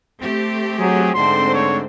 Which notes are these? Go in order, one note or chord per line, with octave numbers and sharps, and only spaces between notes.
A3 C4 G4
F#3 G#4
G#2 D3 A3 C4 C5 C6
C#5